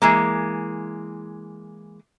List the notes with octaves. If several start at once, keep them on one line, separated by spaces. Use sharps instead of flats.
E3 G#3 A#3